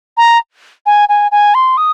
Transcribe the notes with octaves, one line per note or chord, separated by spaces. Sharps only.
A#5
G#5
G#5
G#5
C6
D#6